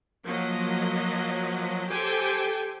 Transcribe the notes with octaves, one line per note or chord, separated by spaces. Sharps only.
F3 F#3 A#3 D#5
G4 A4 C5 G5 G#5